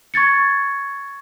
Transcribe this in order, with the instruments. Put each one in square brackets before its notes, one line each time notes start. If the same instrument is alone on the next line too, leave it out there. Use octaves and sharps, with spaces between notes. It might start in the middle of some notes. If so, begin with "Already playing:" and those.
[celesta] C#6 G#6 A6 C#7